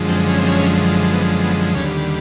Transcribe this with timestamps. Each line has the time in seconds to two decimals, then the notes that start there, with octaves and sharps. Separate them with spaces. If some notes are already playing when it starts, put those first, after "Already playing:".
Already playing: F#2 D3 F3 G#3
0.08 C4
0.29 C#4
0.38 C4
0.48 C#4
1.12 B3
1.43 B3
1.75 D#2 D3 G3 C#4